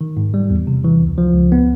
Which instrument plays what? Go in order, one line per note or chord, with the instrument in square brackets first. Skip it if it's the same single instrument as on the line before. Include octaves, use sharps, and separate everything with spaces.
[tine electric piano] D#3
G#2
G3
E2
C3
E3
C#2
F3
C#2
B3